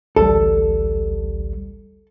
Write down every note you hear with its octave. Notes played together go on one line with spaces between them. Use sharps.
A1 D2 G3 A4